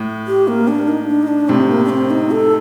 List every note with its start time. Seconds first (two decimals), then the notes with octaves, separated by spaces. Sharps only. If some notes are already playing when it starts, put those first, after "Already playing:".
Already playing: A2
0.27 G4
0.48 A#3
0.68 D4
0.88 D#4
1.08 D4
1.22 D#4
1.28 D4
1.49 A2 C3 C4
1.69 A#3
1.85 D4
1.90 C4
2.10 D#4
2.31 A4